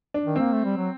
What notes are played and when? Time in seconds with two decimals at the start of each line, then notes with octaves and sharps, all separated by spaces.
0.14 D4
0.25 D#3
0.36 A#3 C4
0.52 A3
0.65 G3
0.77 F#3